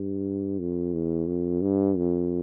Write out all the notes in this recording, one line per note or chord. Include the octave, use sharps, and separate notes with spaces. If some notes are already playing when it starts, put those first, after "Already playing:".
Already playing: G2
F2
E2
F2
G2
F2